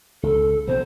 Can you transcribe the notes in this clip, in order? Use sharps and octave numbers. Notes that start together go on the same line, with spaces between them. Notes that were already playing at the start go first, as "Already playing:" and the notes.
C#2 A4
A#1 B2 C4 C5